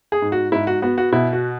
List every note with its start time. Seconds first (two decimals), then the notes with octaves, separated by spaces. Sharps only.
0.12 G#4
0.22 G#2
0.32 F#4
0.52 G#2 E4
0.67 F#4
0.82 B3 F#4
0.98 F#4
1.12 B2 E4
1.33 F#4